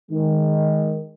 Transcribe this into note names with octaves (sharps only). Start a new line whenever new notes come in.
D#3 G#3